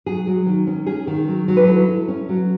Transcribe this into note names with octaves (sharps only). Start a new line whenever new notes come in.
F#3 G#4
F#3
D#3
C#4
C#4 G#4
D#3
F#3
F#3
B4
E4 A4
E4
C#4
F#3